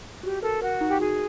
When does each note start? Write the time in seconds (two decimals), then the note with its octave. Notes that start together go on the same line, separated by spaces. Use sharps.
0.23 F#4 G4
0.42 A4 A#4
0.62 F#4 A#4
0.81 D#4
0.89 G4
1.00 F#4 G#4